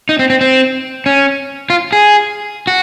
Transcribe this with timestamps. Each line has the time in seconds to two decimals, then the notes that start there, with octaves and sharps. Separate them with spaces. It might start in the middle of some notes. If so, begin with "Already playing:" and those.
0.09 D#4
0.19 C4
0.30 C4
0.41 C4
1.06 C#4
1.70 F4
1.92 G#4
2.67 F#4